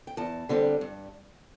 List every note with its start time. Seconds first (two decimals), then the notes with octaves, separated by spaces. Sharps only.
0.07 G5
0.17 E2 A5
0.49 D3 G3 C4
0.81 G2